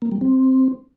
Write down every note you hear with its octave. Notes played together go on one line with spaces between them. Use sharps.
A#3
G3
C4